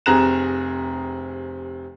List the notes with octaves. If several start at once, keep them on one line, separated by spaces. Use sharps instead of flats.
F1 C3 G#4 A#5 F#6 E7